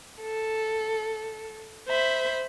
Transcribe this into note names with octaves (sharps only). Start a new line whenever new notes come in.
A4
C5 E5 B5